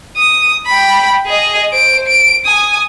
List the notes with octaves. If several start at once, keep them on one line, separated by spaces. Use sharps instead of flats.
D#6
G5 B5
G#4 D#5
C5 D7
D7
G#5 D#6